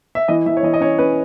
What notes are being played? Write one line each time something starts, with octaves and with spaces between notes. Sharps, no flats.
E5
E3 D#5
E3 E5
C#5
E3 D#5
D#5
C#4 C#5
C#4 B4